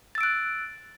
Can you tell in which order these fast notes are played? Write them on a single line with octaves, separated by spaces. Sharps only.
A6 E6 D7 F#6